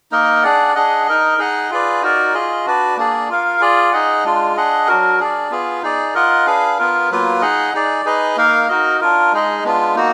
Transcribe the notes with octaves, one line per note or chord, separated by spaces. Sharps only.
A#3 D#4 A#4 D#5
D4 G#4 D5 F#5
D4 G#4 D#5 F#5
D#4 A#4 D#5
D#4 G#4 D#5 F#5
F4 G#4 B4 D5
D#4 F#4 A#4 D5
F4 G#4 D#5
D4 F#4 B4 D5
A#3 D4 G#4 D5
F4 A#4 F5
F4 G#4 D5
D#4 G#4 D#5 F#5
G#3 D4 F4
D4 G#4 D#5 F#5
F#3 D4 F#4 A#4
D4 G#4 D5
B3 F4 G#4
D#4 G#4 D5
F4 A#4 D#5 F#5
D4 G#4 B4 F5
B3 F4 A#4
F#3 A#3 F4 B4
D#4 G#4 D#5 F#5
D#4 G#4 D5
D#4 G#4 B4 D#5
A#3 D#4 A#4 F5
D#4 F#4 A#4 D#5
D4 F4 A#4
G#3 D#4 G#4 D#5
G#3 B3 D4 F4
A#3 D#4 F#4